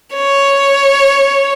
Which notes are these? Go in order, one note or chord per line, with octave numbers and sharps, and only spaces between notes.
C#5